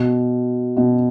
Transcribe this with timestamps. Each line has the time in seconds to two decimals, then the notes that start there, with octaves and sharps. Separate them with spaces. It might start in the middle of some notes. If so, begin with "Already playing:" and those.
Already playing: B2
0.77 B2